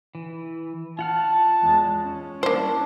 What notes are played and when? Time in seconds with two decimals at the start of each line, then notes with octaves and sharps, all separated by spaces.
0.15 E3
0.99 F4 F#5 A5 F6
1.62 E2 G#3
2.02 C#4
2.43 G3 A#3 D4 E4 C5